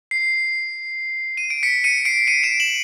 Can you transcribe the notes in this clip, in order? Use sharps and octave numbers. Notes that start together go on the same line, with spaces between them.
C7
D#7
D7
B6 C#7
C#7 D#7
C7 D7
C#7 D#7
D7 E7
E7 F#7